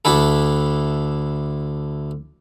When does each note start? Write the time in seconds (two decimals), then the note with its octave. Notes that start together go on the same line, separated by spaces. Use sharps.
0.05 D2 D4 E4 A4